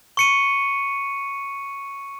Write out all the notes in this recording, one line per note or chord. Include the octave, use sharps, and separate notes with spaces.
C#6 C#7 D#7